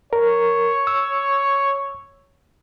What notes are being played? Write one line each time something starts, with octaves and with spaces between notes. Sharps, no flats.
A#4 C#5
E6